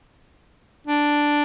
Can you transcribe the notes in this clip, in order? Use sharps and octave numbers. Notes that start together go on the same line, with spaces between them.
D4